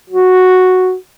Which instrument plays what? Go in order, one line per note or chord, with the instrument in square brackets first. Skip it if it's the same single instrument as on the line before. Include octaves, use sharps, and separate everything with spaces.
[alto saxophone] F#4